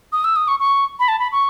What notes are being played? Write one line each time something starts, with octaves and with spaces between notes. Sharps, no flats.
D#6
E6
D#6
C#6
C#6
B5
A5
B5
C#6